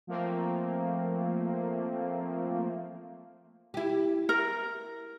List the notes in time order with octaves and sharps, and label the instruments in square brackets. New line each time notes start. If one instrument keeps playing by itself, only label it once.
[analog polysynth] F3 A3 A#3 C4
[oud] E4 G4
[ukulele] A#4